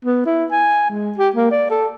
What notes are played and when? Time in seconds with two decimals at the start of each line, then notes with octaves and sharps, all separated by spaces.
0.05 B3
0.26 E4
0.52 G#5
0.91 G#3
1.18 G4
1.36 A#3
1.51 D5
1.70 A4